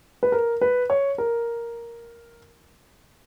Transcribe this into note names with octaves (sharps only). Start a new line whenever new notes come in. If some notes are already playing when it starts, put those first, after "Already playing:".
B4
A#4
B4
C#5
A#4